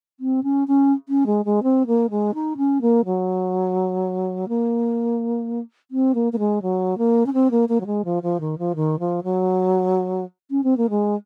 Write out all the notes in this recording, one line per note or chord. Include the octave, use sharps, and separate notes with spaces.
C4
C#4
C#4
C#4
G#3
G#3
C4
A#3
G#3
D#4
C#4
A#3
F#3
A#3
C4
A#3
A#3
G#3
F#3
A#3
C#4
C4
A#3
A#3
F#3
G#3
F3
F3
D#3
F3
D#3
F3
F#3
C#4
C4
A#3
G#3